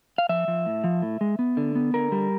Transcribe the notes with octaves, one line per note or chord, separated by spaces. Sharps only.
F5
F3 E5
F3
A2
F3
A2
G#3
B3
D3
B3
D3 A#4
G3